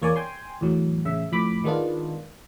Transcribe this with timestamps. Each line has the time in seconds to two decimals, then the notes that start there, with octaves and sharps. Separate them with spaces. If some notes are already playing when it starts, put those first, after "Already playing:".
0.02 E2 A#3 C#5 D5 G#5
0.16 G5 G#5 C6
0.61 E2 A2 F#3
1.05 A1 C#3 E5
1.32 F2 A2 B5 D6
1.64 D#3 G#3 B3 D4 F4